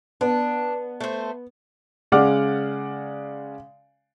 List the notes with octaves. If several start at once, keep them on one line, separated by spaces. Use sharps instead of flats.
B3 D4
A3 C5
C#3 G#3 D5 F#5 D6 F6